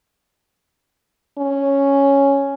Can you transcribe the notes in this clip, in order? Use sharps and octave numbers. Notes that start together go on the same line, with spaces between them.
C#4